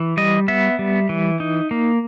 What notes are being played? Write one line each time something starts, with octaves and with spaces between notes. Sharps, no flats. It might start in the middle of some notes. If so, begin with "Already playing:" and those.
Already playing: E3
G3 D#5
B3 E5
G3
E3
D#4
A#3